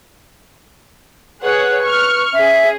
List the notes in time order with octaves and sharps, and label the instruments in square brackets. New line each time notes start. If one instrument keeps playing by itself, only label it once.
[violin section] G#4 C#5 F#5 [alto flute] B4
[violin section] C#6 F6
[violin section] C#4 G#4 [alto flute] E5